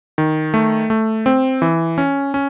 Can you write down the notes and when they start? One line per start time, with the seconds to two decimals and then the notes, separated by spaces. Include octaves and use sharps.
0.18 D#3
0.54 A3
0.90 A3
1.26 C4
1.62 E3
1.98 C#4
2.34 C#4